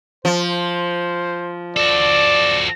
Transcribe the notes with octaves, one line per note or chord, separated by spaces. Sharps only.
F3 C5
F#4 A4 D5